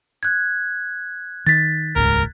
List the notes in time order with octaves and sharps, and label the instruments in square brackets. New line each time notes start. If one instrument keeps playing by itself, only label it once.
[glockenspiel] F#6 G#6
[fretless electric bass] D#3 [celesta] A6 B6
[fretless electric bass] D#1 C#2 G#2 [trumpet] A#4